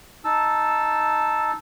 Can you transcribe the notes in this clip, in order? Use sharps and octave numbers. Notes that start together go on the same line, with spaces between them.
D#4 A5 E6